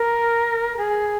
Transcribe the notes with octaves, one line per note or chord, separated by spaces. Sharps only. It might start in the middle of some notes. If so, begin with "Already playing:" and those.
Already playing: A#4
G#4